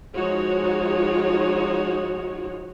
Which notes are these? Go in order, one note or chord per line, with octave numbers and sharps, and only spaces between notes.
F3 G#3 D#4 F#4 C#5